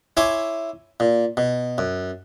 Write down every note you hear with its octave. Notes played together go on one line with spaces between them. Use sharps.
E4 C#5 E5 G#5 C6 D6
A#2
B2
F#2